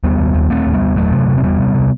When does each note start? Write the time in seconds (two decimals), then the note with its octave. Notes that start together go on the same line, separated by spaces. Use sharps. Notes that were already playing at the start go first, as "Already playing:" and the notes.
0.04 D#2 G3 B3
0.19 D#2
0.34 D#2
0.50 D#2 A3 C4
0.66 D#2
0.74 G3 B3
0.81 D#2
0.96 E2 F#3 A3
1.12 C3
1.28 C3
1.37 C4
1.43 E2 G3 B3
1.59 C3
1.74 C3